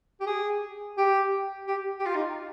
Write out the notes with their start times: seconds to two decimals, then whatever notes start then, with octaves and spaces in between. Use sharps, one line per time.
0.21 G4
0.26 G#4
0.98 G4
1.68 G4
2.00 G4
2.07 F4
2.15 D#4